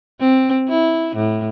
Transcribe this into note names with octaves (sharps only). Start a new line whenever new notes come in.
C4
E4
A2